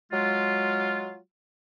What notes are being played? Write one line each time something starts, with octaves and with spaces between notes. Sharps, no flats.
F#3 G#3 F4